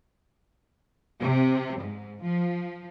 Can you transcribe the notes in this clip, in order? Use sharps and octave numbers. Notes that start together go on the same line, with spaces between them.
C3
G#2
F3